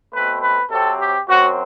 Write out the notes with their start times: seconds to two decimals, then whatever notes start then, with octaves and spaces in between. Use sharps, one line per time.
0.13 B2 A3 C4 B4
0.42 B4
0.70 C3 F#3 C4 A4
0.98 G4
1.27 F#2 F#3 C4 F#4